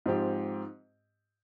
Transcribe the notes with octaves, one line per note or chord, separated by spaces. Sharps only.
G#2 F3 C4 G4